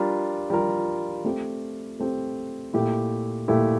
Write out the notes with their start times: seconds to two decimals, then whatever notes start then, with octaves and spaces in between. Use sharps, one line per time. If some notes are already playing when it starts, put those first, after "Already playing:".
Already playing: G3 D4 F4 A#4
0.50 G3 D4 F4 A#4
1.24 A3 C4 G4
2.00 A3 C4 G4
2.74 A#2 A3 E4 G4
3.48 A#2 A3 E4 G4